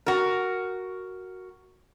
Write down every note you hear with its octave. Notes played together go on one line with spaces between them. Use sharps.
F#4 A#4